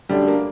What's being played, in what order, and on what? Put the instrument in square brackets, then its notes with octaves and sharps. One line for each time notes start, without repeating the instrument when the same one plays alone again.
[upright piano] F#2 D3 A3 D4 G4 [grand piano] G3
[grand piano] A#3